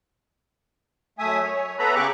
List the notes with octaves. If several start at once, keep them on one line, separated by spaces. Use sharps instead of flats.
F#2 A3 E5 G#5 D#6
C#5
B3 A4 B4 E5 A#5 B5
C#3 G4 G#4 C#6 D6 F#6